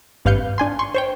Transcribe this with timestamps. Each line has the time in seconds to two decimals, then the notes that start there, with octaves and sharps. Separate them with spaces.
0.25 G#1 G2 B4 F5 G6 C#7
0.58 D4 G#5 C6
0.79 C6 C#6
0.94 C5 C#5 G5